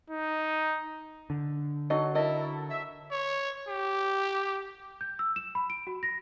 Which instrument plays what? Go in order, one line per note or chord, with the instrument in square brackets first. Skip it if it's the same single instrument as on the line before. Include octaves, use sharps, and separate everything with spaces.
[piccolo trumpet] D#4
[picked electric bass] D3
[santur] F#3 A4 C6 [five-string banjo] D#4 D#5
[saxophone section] E4 A#4 [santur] A4 [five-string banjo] D#5
[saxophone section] E5
[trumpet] C#5
G4
[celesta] G6
E6
E7
B5
D7
F#4
A#6